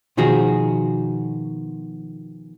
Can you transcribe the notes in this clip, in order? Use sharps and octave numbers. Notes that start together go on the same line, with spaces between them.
B2 D#3 F3 F#4 G#4